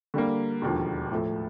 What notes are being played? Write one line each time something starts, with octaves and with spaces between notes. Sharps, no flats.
D3 G3 A#3
E1 D#2 D3 F3
A2 F3 A3